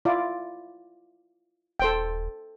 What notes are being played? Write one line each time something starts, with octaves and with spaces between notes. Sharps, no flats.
E4 F4 D5
D#1 A4 C5 G5